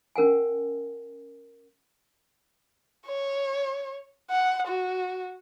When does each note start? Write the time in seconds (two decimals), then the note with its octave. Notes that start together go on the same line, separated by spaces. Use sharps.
0.16 C#4 A#4 F#5 G#5
3.07 C#5
4.31 F#5
4.68 F#4